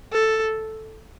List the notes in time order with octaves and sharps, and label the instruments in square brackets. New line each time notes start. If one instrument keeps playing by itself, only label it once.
[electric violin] A4